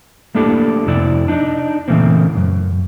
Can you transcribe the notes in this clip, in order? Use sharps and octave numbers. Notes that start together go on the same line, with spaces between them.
A3 A#3 D4 E4 G4 A4
F2 C3 E4 D5
D4 D#4
A#2 C#3 E3 A3 A#3 C4
F#2